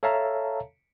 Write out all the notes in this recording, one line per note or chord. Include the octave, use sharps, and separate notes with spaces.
A4 C#5 E5 F5 A5 A#5